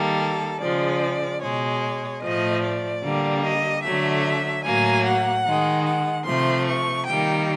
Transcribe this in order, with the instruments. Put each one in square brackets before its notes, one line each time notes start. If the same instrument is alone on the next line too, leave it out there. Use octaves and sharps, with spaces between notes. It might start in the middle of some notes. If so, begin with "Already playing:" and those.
Already playing: [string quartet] D#3 G3 A#3 A4
C#3 F3 G#3 D5
B2 G#3 C#5
A2 F3 A3 D#5
D5
D3 G3 A#3
D#5
D3 F#3 A3 E5
A2 F#3 A#3 G#5
F#5
D#3 G#3
F#5
C3 F3 A3 C6
C#6
D#3 G3 A#3 G5